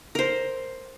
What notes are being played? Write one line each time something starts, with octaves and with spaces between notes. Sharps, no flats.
A#4 C5